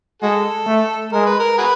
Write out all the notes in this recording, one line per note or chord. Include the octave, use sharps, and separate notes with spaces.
G#3 F#4 A4
A3
G#3 A#4
B4
A#4
F#4 G#4 B4